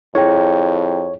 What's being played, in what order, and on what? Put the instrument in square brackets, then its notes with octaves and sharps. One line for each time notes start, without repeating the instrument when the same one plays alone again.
[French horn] F2 [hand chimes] E4 G#4 G5 [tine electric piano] C#5